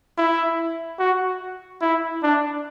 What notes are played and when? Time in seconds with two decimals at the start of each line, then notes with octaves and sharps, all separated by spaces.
0.18 E4
0.99 F#4
1.81 E4
2.23 D4